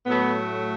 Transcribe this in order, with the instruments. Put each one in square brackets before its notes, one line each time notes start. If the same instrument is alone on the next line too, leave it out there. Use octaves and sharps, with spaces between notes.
[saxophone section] A2 F#3 A3 B3